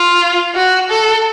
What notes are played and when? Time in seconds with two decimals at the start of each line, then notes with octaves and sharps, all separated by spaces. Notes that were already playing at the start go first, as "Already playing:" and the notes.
Already playing: F4
0.55 F#4
0.90 A4